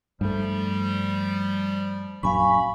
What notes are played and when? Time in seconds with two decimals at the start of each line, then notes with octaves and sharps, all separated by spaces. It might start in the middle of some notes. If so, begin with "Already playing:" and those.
0.21 G2 F3 G3 A3
2.23 A#1 F#2 F5 G#5 B5 C#6